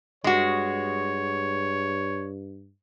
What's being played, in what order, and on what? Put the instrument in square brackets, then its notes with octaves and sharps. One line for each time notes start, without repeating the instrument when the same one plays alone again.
[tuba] G2 [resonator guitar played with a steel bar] G#3 F#4 [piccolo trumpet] C#5